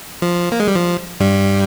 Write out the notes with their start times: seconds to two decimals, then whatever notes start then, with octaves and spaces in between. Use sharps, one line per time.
0.22 F3
0.52 A#3
0.60 G#3
0.67 G3
0.76 F3
1.20 G2 G3